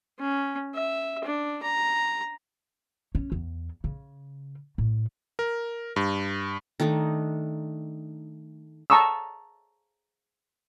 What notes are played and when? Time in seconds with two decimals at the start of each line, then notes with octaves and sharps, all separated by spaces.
0.19 C#4
0.74 E5
1.24 D4
1.62 A#5
3.15 C#4
3.32 E2
3.84 C#3
4.78 A2
5.39 A#4
5.96 G2
6.80 D#3 A3 D4 D#4
8.90 A5 A#5 C#6 D#6 E6